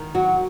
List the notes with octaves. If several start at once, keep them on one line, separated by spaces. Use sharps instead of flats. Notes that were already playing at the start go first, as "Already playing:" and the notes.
Already playing: D#3
F#3 F#4